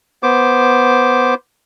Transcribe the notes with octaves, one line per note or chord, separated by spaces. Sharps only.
B3 C5 D6